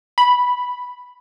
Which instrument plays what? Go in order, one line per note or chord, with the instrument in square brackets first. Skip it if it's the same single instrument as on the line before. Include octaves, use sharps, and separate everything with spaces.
[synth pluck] B5